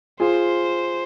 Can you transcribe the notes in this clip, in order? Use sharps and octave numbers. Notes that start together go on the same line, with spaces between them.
F4 G#4 C5